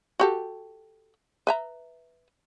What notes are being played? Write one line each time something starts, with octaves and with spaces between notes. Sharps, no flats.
F#4 G4 A4
B4 E5 A#5